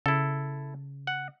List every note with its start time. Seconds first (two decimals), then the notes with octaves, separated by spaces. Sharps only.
0.06 C#3 E4 A4
1.07 F#5